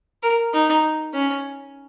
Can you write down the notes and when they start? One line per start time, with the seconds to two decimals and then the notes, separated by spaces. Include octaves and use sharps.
0.23 A#4
0.53 D#4
1.14 C#4